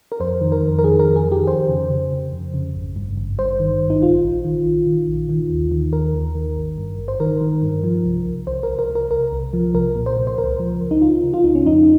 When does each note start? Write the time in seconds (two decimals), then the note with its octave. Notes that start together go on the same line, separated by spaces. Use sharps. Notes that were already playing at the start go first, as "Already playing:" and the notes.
0.12 A#4
0.20 F2 C5
0.41 D#3
0.52 A#4
0.62 F2
0.79 A#4
0.84 D#3 G#4
1.00 A#4
1.05 F2
1.16 G#4
1.26 D#3
1.32 G4
1.47 F2 C5
1.69 C#3
1.90 C#3
2.12 C#3
2.32 F2
2.54 C#3
2.75 G#1
2.96 G2
3.17 G#1
3.38 G2 C5
3.60 D#3
3.81 G#1
3.90 D#4
4.02 A#1 F4
4.23 A#1
4.45 D#3
4.66 A#1
4.87 D#3
5.08 A#1
5.29 D#3
5.50 D#2
5.71 D#3
5.93 D#2 A#4
6.14 D#2
6.35 D#3
6.57 G#1
6.78 G2
6.99 G#1
7.08 C5
7.20 D#3 A#4
7.41 D#3
7.62 G2
7.84 F3
8.05 C2
8.26 C2
8.47 C2 C5
8.63 A#4
8.68 C2
8.79 A#4
8.90 C2
8.95 A#4
9.11 C2 A#4
9.32 C2
9.53 F3
9.74 C2 A#4
9.96 A#2
10.06 C5
10.17 C2
10.27 C5
10.38 C#2 A#4
10.59 F3
10.81 C#2
10.91 D#4
11.02 C#2 F4
11.23 C#3
11.34 F4
11.44 C#2 D#4
11.55 C#4
11.65 F2 D#4